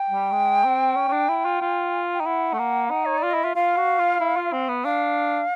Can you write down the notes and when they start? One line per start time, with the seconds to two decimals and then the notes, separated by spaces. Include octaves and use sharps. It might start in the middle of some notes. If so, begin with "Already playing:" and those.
Already playing: G5
0.10 G3
0.32 G#3
0.64 C4
0.96 C#4
1.08 C#4
1.12 D4
1.29 E4
1.45 F4
1.62 F4
2.14 G5
2.20 D#4
2.26 E4 F#5
2.53 A3
2.59 A#3
2.91 D#4
3.05 C#5
3.18 D5
3.23 F4
3.31 E4 D#5
3.43 F4 E5
3.55 F4 F5
3.77 F#4
3.99 F4
4.20 E4
4.36 F4
4.53 C4
4.69 B3
4.85 D4 F5